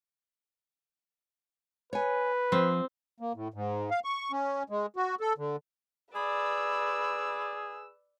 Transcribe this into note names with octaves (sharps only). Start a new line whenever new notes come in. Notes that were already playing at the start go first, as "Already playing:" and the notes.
B4 C#5 G#5
F3 C4
A#3
A2
G#2
F5
C#6
C#4
G#3
F#4
A4
D3
G#4 B4 D5 B5 E6